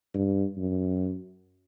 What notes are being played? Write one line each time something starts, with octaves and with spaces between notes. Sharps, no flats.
G2
F#2